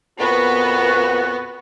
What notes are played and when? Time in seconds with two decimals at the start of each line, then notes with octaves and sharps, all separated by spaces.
0.20 F2 A#2 B3 F#4